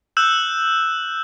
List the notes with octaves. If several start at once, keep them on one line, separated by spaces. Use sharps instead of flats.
E6 F#6 G6 E7 F#7